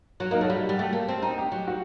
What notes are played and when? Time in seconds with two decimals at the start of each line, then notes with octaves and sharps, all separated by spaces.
0.20 F#3 F#4
0.31 A#3 D#4
0.41 A3 F#4
0.50 G3
0.69 G3
0.78 A3 G4
0.93 A#3
1.08 C4
1.22 D#4
1.38 G4
1.52 F#3
1.67 F#4